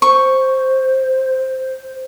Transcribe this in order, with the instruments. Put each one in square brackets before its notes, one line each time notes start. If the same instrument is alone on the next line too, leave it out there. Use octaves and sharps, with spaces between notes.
[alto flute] C5 [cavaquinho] C#6